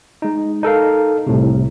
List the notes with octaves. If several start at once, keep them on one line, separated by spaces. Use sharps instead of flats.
G#3 D#4
D#4 A4 A#4 F5
C2 A2 C3